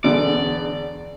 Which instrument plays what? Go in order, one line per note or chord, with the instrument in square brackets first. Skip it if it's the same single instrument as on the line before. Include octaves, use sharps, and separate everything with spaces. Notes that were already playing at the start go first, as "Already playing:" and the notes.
[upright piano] E1 E2 D3 [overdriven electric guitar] D5